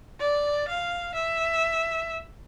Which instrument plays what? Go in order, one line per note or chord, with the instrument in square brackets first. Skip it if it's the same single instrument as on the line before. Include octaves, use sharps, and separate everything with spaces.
[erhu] D5
F5
E5